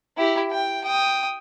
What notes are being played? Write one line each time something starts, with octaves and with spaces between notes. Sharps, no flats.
E4 G4
G5
G5 D#6